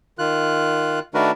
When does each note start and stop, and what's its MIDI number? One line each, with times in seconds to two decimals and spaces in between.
0.19 0.99 51
0.19 0.99 65
0.19 0.99 90
1.14 1.31 51
1.14 1.31 57
1.14 1.31 62
1.14 1.31 66
1.14 1.31 70
1.14 1.31 71